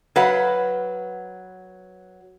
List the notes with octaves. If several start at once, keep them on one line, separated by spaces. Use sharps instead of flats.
F#3 B4 F5 F#5